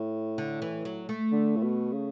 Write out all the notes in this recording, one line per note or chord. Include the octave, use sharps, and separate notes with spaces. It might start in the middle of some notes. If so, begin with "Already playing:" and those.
Already playing: A2
D3
E3
F#3
A3
D3
A2
B2
C#3